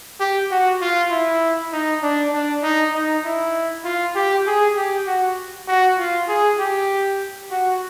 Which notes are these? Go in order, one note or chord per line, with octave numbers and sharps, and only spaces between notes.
G4
F#4
F4
E4
D#4
D4
D4
D#4
D#4
E4
F4
G4
G#4
G4
F#4
F#4
F4
G#4
G4
F#4